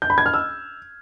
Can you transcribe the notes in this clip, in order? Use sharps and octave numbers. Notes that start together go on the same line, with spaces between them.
G6
B5
G#6
F6
E6